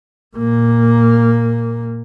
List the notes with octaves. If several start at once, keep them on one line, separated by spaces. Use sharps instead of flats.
A#2 A#3